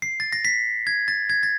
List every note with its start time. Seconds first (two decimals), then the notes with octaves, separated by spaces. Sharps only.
0.02 C7
0.20 A6
0.33 A#6
0.45 B6
0.87 G#6
1.08 A6
1.30 G#6
1.43 A6